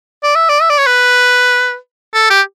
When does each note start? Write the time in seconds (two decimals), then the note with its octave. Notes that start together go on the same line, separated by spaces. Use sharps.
0.23 D5
0.35 E5
0.49 D5
0.62 E5
0.70 D5
0.78 C#5
0.87 B4
2.14 A4
2.30 G4